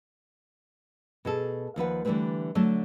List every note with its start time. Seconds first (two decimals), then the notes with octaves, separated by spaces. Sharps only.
1.25 B2 G#4 A4
1.76 D#2 F3 B4 F#5
2.05 D3 E3 G3 A3 C4 B4
2.55 D3 F#3 A3 A5